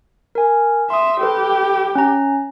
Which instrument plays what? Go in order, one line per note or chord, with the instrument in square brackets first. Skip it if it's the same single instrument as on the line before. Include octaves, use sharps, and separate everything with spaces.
[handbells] A#4 G#5
[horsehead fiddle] E5 [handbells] C6 D#6
[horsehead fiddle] G4 [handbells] A4 B4
[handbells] C#4 A#5